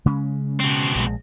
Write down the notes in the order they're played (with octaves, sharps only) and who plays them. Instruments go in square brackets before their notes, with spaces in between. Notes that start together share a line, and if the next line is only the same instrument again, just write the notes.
[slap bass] C#3 G#3 C#4
[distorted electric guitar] B2 C4
[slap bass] A#1 C#3 G#3